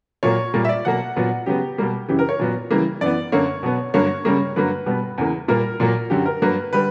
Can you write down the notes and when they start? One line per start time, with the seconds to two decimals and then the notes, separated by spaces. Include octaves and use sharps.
0.23 A#2 F#3 A#3 C#5
0.54 A#2 G3 A#3
0.65 E5
0.69 D5
0.85 B2 F#3 A#3 F#5
1.16 A#2 F#3 B3
1.46 C#3 F#3 B3 G4
1.78 B2 G3 A#3
2.09 F#2 C#3 E3 G4
2.19 A#4
2.29 C#5
2.39 A#2 F#3 B3
2.71 C#3 E3 G3 A#3
3.01 F#2 E3 B3 D5
3.32 F#2 D3 A#3 C#5
3.63 B2 F#3 B3
3.94 G2 D3 F#3 A#3 C#5
4.25 C#3 G3 A#3
4.56 G2 D3 F#3 A#3 B4
4.86 B2 G3 B3
5.18 E2 C#3 E3 A#3
5.48 A#2 G3 A#3 A#4
5.80 A#2 F#3 A#3
6.10 F#2 D3 F#3 G4
6.26 A#4
6.42 G2 F#3 A#3 B4
6.73 D3 G3 B4